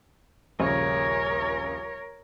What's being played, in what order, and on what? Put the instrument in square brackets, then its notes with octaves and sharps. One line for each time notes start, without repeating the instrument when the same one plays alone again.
[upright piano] D#1 A#1 C#3 [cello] A#4 C#5